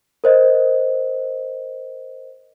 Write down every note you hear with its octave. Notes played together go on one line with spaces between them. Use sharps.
A#4 C5 D#5